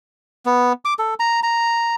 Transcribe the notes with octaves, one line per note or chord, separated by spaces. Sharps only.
B3
D6
A4
A#5
A#5